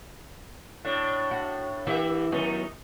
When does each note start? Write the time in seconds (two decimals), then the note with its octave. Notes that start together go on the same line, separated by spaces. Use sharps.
0.85 A2 D4
1.31 F#4
1.87 E3 A#3 G4 E5
2.32 D#3 F#3 B3 C#4 D#4